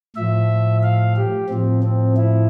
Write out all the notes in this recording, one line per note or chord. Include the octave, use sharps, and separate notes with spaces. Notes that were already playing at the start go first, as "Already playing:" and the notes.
A2 F3 E5
F5
G4
A2 F3 C4
C4
E4